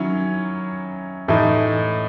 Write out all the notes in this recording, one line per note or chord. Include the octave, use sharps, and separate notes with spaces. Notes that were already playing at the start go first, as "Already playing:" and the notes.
Already playing: D#3 F#3 C#4 E4
A2 E3 A3 D#4